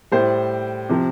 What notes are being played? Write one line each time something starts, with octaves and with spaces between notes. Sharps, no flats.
A2 G3 C5
C3 F3